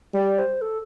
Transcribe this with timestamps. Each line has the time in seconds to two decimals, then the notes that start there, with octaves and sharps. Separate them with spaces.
0.14 G3 D5
0.39 C5
0.61 A4